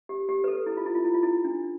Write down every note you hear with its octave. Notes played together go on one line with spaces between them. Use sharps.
G4
G4
B4
A4
E4
F4
E4
F4
E4
F4
E4
D4